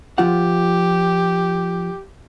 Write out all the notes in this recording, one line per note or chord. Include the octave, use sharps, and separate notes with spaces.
F3 F4 G4 F#5